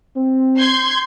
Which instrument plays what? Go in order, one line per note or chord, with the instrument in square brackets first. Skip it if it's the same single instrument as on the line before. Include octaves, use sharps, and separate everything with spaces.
[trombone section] C4
[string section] C6 G6 G#6